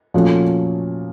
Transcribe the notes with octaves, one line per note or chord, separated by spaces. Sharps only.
A#2 F3 A3 C#4 F#4